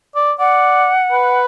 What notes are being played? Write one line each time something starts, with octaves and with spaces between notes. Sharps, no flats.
D5
D5 F#5
B4